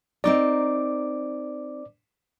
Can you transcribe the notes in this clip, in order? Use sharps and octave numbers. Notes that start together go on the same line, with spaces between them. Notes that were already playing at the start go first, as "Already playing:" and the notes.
C4 D#4 A#4 D5 D6